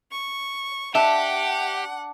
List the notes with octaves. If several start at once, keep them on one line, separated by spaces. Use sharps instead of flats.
C#6
D4 G4 E5 F#5